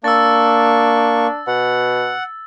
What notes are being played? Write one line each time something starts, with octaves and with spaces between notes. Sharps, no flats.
A#3 D4 C#6 E6 A6
B2 F#5